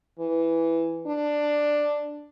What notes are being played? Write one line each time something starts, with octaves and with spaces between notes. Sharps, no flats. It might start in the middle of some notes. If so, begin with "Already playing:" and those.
E3
D4